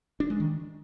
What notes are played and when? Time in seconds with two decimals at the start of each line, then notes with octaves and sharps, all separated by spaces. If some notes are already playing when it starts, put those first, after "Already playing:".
0.20 D4
0.30 G#3
0.40 D#3